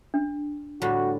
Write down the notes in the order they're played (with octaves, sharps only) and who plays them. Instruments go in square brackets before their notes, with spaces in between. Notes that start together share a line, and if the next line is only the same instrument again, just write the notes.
[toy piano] D4
[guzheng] A2 D3 G3 [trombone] F#4